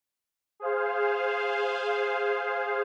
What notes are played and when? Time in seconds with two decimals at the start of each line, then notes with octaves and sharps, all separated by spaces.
0.60 G#4 C5 F5